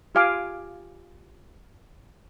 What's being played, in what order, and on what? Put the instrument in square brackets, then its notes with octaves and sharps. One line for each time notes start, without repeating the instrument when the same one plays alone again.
[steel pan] F4 G4 F5 G#5 D6